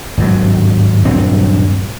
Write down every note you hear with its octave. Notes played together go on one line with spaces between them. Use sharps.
G#1 G2 F#3
D#1 G2 F#3 C4